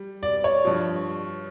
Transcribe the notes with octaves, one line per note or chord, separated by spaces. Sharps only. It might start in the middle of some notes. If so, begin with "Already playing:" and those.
Already playing: G3
D5
C#5
G2 F3